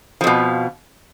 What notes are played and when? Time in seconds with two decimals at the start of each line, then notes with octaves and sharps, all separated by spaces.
0.21 F3
0.24 F2
0.27 B2